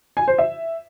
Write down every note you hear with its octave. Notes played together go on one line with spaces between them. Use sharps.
G#5
C5
E5